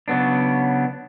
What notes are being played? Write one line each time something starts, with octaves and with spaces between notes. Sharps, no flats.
C#3 F#3 B3 D4